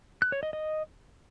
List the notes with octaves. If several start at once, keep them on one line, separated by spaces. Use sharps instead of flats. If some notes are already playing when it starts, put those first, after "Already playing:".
F#6
C#5
D#5
D#5